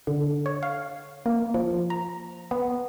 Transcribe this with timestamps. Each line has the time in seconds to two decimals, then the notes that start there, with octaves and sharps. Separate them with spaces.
0.07 D3
0.46 C#5
0.63 F5
1.26 A#3
1.54 F3
1.90 A#5
2.51 B3